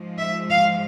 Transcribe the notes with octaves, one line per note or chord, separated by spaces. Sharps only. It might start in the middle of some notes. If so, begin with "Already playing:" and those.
Already playing: G#2 F3 G#3
E5
F5